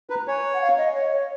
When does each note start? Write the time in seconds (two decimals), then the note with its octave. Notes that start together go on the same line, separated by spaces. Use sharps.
0.10 B4 A#5
0.27 C#5 G#5
0.53 F#5
0.61 F5
0.77 D#5
0.94 C#5
1.12 C#5